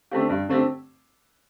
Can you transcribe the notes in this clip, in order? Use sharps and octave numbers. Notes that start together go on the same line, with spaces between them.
D3 A3 C4 G4
G2
D3 A3 C4 G4